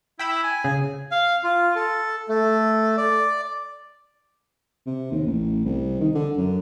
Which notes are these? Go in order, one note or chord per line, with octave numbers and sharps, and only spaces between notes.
E4 G5 B5 E6
G#5
C#3 G#4
F5
F4
A4
A3
D5
C3
D#2
A1
C2
D#3
D3
F#2